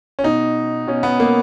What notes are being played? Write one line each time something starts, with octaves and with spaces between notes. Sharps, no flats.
C#4
B2 D#4
B2 C#4
B3
A#3